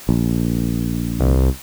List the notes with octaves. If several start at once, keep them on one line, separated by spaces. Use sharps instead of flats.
A#1
C2